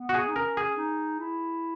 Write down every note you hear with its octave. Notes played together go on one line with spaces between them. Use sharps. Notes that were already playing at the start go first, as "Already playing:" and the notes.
Already playing: B3
F#4
G#4
D#4
C#4 A#4
G#4
D#4
E4